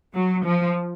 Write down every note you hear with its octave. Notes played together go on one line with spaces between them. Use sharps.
F#3
F3